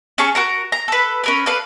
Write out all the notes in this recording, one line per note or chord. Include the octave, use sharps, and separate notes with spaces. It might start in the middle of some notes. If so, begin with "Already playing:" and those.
C#4 G#4 A5 C#6
F#4 A#4 A#5
A#5
A4 B4
C#4 A#4 B4
A4 B4 D5 F5